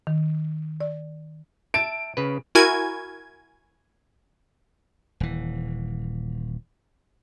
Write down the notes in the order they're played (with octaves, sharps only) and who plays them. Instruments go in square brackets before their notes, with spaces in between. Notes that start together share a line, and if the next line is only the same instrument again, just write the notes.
[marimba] D#3
D5
[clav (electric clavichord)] E5 A5 [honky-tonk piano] D7
[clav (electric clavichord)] C#3 B4
[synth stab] E4 F#4 A#4 G#5 G#6
[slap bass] D#1 E3